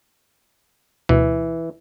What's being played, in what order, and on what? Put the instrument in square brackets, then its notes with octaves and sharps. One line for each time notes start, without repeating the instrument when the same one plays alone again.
[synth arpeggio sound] D2 B2 [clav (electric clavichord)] E3